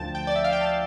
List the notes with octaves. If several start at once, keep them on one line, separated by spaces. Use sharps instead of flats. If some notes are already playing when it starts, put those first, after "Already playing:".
Already playing: D2 D3 F3 G5 A5
G5
D5
E5
F5
G5
A5